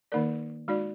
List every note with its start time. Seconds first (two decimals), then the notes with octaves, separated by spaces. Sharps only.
0.12 D#3 A#3 D#4 A#4 D5
0.68 G#3 D#4 F#4 D5